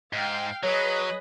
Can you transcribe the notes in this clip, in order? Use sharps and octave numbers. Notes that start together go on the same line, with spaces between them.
G#2 F5 G5
F#3 G#4 B4 C#5 D#5